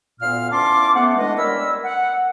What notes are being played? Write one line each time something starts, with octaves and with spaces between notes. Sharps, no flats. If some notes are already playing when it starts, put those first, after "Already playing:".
D2 A#2 B3 F5 F6
E3 C#4 A5 C6 D6
A3 B3 C5 F#5
E3 G#3 A3 D4 B4 D#5
G3 A#4 C#5 B5 E6
F#5